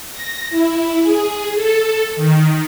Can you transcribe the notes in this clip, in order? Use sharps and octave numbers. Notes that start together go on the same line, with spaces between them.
A#6
E4
G#4
A4
D#3